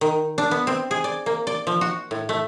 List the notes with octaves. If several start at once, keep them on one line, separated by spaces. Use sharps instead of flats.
D#3
D4
B3
C4
G#4
D5
A#3
D5
F3
F#4
A2
A3